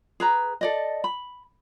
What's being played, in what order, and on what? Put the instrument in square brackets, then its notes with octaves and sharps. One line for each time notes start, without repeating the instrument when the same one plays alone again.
[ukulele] G#4 B4 A#5
A4 D5 D#5
B5